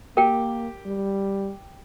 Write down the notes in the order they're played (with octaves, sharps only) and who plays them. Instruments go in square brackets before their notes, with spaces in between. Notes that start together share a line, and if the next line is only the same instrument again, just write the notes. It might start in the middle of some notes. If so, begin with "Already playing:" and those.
[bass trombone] A#3 [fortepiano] G4 [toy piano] A#4 G5
[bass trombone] G3